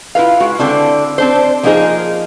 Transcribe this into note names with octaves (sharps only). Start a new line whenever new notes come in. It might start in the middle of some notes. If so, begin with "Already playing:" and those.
E4 F4 B4 F5
G#3 F#4
D3 C4 D4 E4
C4 D4 C5
F3 A#3 B3 D#4 G#4 C5